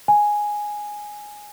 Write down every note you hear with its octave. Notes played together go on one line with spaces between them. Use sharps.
G#5